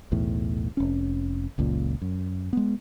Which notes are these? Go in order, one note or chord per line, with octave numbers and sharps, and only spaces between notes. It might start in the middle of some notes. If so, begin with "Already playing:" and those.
B1 E2 A2
F1 C#4
F#1 C#2 F#2 A#2
F#2
G#3 B3